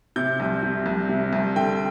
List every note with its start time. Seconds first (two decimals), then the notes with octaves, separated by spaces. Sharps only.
0.16 C3 G6
0.40 C2
0.63 C3
0.86 C2
1.09 C3
1.33 C2
1.56 D3 G5